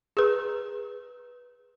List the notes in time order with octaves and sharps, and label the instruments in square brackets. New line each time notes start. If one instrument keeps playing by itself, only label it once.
[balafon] G#4 B4